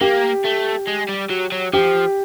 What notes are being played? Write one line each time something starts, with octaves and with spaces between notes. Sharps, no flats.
A#3 G4
A3
G#3
G3
F#3
F#3
F3 G4